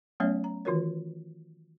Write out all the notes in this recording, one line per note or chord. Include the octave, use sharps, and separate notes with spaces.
F#3 A3 B3 C#4 C#5 E5
A#5
D#3 E3 F4 F#4 A#4 C#5